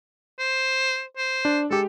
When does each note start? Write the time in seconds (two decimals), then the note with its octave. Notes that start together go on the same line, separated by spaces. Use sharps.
0.39 C5
1.17 C5
1.45 D4
1.70 G#3 G4 A4